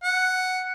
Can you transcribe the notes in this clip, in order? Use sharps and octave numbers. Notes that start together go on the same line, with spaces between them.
F#5